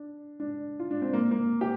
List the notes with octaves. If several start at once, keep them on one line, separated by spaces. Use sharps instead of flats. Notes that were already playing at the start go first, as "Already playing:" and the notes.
Already playing: D4
D4
F4
D4
C4
A#3
A#3
G4